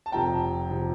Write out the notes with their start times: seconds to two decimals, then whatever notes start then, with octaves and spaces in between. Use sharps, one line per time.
0.06 A5
0.12 F1 F2 C3 F3 G5 A#5
0.70 C3 F3